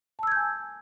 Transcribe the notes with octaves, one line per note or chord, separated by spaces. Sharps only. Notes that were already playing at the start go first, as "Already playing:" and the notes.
G#5 A5 E6 G6 G#6